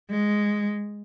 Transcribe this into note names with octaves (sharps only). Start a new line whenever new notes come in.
G#3